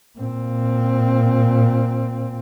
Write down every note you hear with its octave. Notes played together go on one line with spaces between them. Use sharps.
A#2 C4